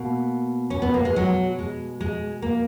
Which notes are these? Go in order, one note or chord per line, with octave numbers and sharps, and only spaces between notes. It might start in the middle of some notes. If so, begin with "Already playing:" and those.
Already playing: B2 A#3
C#4
B3
A#3
G#3
F#3
G#3
G#3
A#3